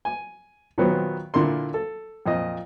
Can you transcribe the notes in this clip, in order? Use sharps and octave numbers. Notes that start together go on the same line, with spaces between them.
G#5
A#2 D#3 F#3 B3 C4
A#2 D3 E4 A#4 C6
A4
F2 A#2 F3 D#5